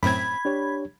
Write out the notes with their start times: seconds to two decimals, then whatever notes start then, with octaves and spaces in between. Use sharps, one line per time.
0.03 F#2 A2 C4 B5 G#6
0.45 D4 G4 C#5